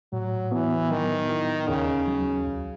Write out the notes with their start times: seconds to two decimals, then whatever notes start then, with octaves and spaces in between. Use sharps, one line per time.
0.13 A2 F#3
0.52 E3 B3
0.90 D#3 F#3
1.30 E4
1.68 D#2 C#3
2.08 F#3
2.47 C#2